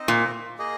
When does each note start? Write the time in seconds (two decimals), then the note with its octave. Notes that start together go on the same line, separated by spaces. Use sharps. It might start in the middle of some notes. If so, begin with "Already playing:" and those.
Already playing: C4 D#4 C5 D#5
0.08 A#2
0.58 A#3 G#4 D#5